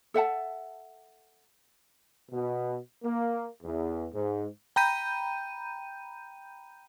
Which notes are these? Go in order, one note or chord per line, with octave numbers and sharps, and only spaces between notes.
A4 E5 F#5 A5
B2
A#3
E2
G#2
G5 A#5 B5 G6 D#7